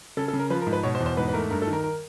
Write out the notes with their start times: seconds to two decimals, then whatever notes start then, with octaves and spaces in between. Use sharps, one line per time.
0.17 C#3 A4
0.28 A4
0.33 C#3
0.39 A#4
0.50 F3 B4
0.61 A#4
0.67 G#2
0.73 B4
0.83 B2 C#5
0.95 C5
1.00 E2
1.06 C5
1.17 G#2 B4
1.28 B4
1.33 A3 A#4
1.50 G2 A#4
1.62 A4
1.67 D#3
1.73 A#4
1.84 A#4